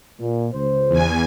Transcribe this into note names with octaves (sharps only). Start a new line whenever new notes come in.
A#2
C#2 C5
E2 G#5